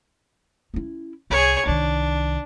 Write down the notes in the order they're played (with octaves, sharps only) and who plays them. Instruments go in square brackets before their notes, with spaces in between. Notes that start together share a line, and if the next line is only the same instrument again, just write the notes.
[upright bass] C#4 E4
[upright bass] C2 [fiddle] G#4 C#5
[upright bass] C2 D#3 [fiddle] D4